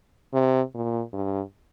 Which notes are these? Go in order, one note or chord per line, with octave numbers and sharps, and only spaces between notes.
C3
A#2
G2